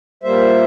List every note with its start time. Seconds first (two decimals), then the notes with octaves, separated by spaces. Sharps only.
0.23 A#2 G3 A#3 C5 E5